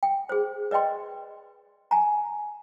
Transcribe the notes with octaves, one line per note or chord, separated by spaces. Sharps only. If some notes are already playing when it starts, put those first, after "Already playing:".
G5
G#4 C5
B4 D5 D#5 G5 C6
G#5 A#5